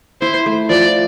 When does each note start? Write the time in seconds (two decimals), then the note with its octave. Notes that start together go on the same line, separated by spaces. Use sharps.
0.22 E4 C5
0.46 A3
0.69 F3 D5